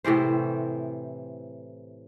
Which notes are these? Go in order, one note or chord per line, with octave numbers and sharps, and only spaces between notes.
A2 C3 E3 C5